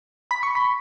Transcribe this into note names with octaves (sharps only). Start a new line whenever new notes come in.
B5
C#6
B5